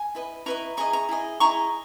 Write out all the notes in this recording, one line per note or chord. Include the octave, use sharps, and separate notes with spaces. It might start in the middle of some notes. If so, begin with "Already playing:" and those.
Already playing: G#5
E4 B4 D#5
E4 B4 D#5 A#5 C#6
E4 G#4 D#5 A#5 C#6
A#5 C#6
E4 G#4 D#5
E4 G#4 D#5 A#5 C#6